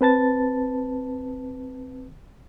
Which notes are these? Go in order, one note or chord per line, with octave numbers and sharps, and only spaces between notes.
C4 B4 A5 A6